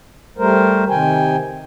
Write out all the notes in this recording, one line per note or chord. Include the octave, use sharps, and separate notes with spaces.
G3 A3 A#4 C5
C3 D#3 G5 G#5